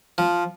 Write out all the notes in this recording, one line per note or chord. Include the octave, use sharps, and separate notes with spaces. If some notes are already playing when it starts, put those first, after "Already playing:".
F3